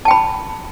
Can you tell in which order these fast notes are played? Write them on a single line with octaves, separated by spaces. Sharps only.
A5 G5 B5